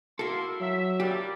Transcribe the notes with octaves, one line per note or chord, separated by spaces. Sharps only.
A#3 E4 F#4 A4 C6
F#3 E5
A#2 G3 D4 G4